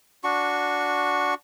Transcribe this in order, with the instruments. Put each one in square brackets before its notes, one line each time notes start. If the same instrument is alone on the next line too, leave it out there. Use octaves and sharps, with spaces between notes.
[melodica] D4 F#4 C#6